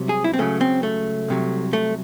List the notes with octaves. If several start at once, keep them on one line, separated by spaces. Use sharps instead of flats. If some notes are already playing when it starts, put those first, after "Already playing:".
Already playing: C2 C3 F#3
G#4
E4
C4
C#2 C#3 F#3 A3
C4
A3
C2 C3 F#3
A3